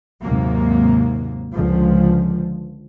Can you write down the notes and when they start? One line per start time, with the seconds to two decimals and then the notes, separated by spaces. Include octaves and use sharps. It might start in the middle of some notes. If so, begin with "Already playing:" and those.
0.22 D#2 G#2 C3 F#3 A#3
1.53 C#2 D3 F3